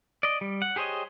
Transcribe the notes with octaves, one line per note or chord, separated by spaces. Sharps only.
D5 D#5
G3
F#5
G4 G#4 C5 C#5 D#5